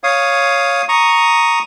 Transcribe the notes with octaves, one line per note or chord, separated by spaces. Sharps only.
C#5 F5 D#6
A#5 C#6 D#6